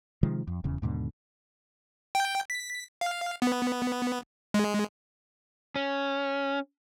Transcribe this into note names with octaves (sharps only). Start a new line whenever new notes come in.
C3 D#3 F3 G#3
F2
D#1 E2 C#3
D#2 G#2 B2 D3
G5
B6
F5
B3
G#3
C#4